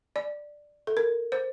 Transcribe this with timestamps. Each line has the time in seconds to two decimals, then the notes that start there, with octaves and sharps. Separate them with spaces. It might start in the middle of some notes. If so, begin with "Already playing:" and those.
0.16 D5
0.87 A4
0.97 A#4
1.32 C5